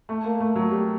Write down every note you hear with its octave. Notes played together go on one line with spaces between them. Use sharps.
A3
A#3
A3
F#3
G3